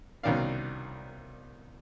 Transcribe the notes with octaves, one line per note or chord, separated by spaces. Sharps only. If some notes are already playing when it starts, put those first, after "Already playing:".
C2 B2 D#3 C#4 D5 F5